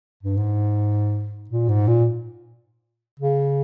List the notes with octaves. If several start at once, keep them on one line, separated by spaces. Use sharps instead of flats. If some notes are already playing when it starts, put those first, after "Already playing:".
G2
G#2
A#2
G#2
A#2
C#3